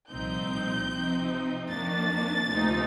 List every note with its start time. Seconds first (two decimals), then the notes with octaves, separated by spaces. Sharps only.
0.11 C2 A#2 F3 C4 D#4 G6
0.90 C3 F3 C4 D#4
1.69 F2 D#3 A#3 D4 A6
2.49 D2 C3 F3 A#3 D#4